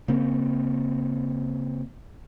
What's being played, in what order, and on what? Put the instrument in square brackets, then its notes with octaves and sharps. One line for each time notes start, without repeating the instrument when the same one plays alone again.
[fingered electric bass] C#3 A#3 C4